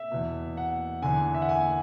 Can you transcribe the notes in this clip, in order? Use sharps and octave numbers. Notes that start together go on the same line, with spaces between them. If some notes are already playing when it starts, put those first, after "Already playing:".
Already playing: E5
E2 B2
F#5
E2 D3 G#5
E5
F#5
G#5